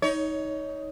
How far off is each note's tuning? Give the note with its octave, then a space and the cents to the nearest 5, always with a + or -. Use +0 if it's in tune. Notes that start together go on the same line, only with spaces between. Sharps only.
D#4 +15 C#5 +20